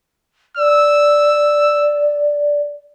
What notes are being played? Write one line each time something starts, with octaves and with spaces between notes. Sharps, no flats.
D5 E6